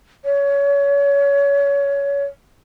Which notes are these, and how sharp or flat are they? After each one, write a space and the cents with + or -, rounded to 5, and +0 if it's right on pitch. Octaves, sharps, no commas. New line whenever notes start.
C#5 +25